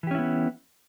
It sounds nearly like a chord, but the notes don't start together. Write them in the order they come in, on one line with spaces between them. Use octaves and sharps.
E3 G4 C#4 E4 B3